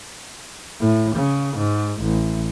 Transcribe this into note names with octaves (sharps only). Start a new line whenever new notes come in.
A2
C#3
G#2
A1